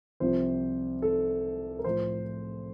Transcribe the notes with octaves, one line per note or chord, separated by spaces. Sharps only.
C2 C3 F3 C5
A4
A#4
A2 F3 C5